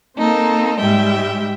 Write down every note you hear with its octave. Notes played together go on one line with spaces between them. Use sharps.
A#3 C4 D#4 A4
G#2 G3 G#3 E5 G5